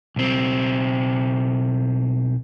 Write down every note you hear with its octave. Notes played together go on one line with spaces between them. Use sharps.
B1 C4